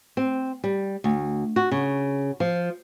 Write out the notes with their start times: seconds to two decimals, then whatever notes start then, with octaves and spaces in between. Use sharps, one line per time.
0.17 C4
0.64 G3
1.04 D2
1.56 F#4
1.71 C#3
2.40 F3